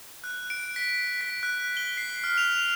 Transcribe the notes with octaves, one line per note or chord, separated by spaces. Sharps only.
F#6
D7
B6
B6
F#6
G7
C7
F6
F7